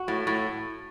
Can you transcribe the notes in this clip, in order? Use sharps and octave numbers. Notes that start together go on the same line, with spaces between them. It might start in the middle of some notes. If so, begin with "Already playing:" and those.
Already playing: F#4
A2
A2